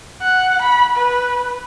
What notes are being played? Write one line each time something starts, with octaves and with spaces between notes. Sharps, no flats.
F#5
B5
B4